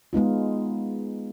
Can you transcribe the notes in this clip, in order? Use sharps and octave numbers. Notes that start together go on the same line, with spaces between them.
G#3 B3 D#4 F4